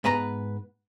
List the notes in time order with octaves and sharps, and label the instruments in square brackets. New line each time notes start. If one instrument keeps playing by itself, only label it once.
[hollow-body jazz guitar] G#2 B3 B4 A#5